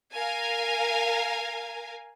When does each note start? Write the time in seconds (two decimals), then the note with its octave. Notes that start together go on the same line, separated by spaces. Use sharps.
0.14 A#4 F5 G#5